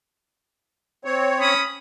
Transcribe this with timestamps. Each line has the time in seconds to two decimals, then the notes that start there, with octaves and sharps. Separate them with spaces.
1.05 C4 C#5
1.41 C#4 B5 D#6